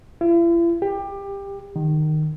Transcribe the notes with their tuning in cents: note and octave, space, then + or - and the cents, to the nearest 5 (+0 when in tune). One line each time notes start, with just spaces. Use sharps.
E4 +45
G4 +20
D#3 -20